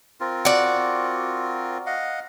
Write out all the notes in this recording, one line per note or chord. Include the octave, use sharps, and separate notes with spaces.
C4 F4 A#4
F#4 D5
D#5 F5 F#5